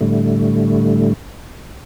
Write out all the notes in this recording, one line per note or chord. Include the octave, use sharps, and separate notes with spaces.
A2 D3 G3 A3